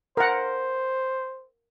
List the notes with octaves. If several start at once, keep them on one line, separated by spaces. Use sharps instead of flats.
A#4 C5 F#5